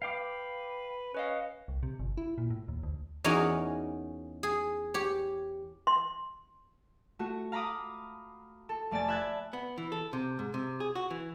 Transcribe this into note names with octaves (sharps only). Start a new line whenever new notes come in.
B4 F5 G5 D6
C#4 B4 D#5 F5
C2
C3
G1
E4
A#2
A2
D#2
D2
E2 C#4 D#4 F#4 A#4 G#5
G#4
G4 C#5
C6
A3 F#4
F5 A#5 B5 D6 D#6
A4
F1 A3 D5 G#5 A6
E5 B5 E6 F#6 G#6 A6
B3
E3
A4
C3
G#2
C3
G#4
F#4
E3